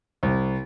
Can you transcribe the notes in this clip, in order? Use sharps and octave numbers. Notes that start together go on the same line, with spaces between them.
C2